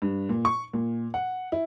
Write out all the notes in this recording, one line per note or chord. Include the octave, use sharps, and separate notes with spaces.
G2
A#2
C#6
A#2
F#5
E4